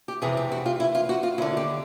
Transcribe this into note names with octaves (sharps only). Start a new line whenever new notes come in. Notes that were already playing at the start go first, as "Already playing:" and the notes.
G4
F2 C3 E3 G#4
G4
F#4
F4
E4
F4
F#4
F4
D#2 D3 E4
G4